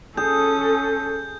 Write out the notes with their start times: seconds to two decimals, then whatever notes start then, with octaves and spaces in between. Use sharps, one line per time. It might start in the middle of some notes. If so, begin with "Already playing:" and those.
0.17 C#4 G#4 A4 G6